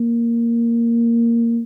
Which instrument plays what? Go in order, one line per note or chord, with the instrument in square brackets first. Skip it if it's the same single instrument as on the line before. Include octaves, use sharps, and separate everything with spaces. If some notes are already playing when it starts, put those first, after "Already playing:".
Already playing: [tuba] A#3